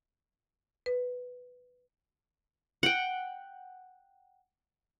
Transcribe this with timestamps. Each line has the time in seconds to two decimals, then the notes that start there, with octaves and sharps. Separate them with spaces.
0.86 B4
2.83 F#5 G5